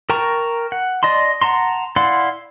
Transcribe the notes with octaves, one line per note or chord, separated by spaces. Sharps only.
A#4 G5 A5 A#5 C#6
F#5
D5 D#5 A5 C6
F#5 A5 A#5 C6
E4 D5 F5 F#5 C6